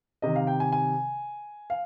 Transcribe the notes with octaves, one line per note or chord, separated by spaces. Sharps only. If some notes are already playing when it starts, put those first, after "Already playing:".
C3 D#3 D#5
F5
G5
G#5
G#5
F5